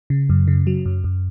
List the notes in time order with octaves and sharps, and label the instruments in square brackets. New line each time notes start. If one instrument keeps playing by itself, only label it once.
[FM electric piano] C#3
F#2
C#3
F#3
F#2
F#2